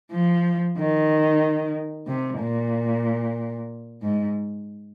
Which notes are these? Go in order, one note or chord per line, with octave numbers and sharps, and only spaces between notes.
F3
D#3
C3
A#2
G#2